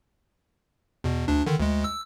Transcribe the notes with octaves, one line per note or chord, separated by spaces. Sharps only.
E2 B2
D2 D4
D3 D#3
D2 G#3
E6